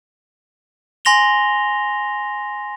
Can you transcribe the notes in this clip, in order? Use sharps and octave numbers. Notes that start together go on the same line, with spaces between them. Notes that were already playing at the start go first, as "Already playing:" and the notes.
G#5 C6 A#6 F7 G7